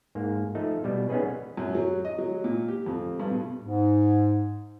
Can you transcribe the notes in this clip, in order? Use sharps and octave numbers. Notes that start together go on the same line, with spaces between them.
G#2 A#3
F3 A3 D#4
B2 G3
B3 C#4 D#4 G#4 B4
F#2
F#3
D#5
F#3
A#2
G4
F2
G2
B2
G#2